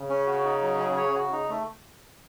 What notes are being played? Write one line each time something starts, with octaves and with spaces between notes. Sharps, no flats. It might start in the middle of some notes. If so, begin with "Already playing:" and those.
Already playing: C#3
C#4
F#4
D#4
F#3
G#4
C#5
F#4
D#4
A3